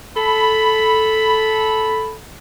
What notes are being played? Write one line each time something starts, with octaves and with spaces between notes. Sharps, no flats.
A4 B5